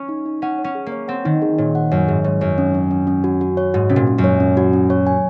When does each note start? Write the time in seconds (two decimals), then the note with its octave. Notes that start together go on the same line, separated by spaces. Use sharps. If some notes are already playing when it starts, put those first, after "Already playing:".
Already playing: C#4
0.09 D#4
0.26 D#4
0.42 C#4 F#5
0.59 C#5
0.64 C#4
0.75 G#4
0.86 A#3
0.92 C#5
1.08 C4 F#5
1.25 D#3 D#4
1.42 G#4
1.58 A#2 C#5
1.75 F#5
1.91 F#2 C#5
2.08 G#2 G#4
2.24 G#2 C#5
2.41 F#2 C#5
2.58 C#4
2.74 C#4
2.91 C#4
3.07 C#4
3.24 F#4
3.41 F#4
3.57 C#5
3.74 G#2 F#4
3.89 C3 C#4
3.96 A#2
4.07 C#4
4.18 F#2
4.24 C#5
4.40 C#4
4.57 F#4
4.73 C#4
4.90 C#5
5.07 G#5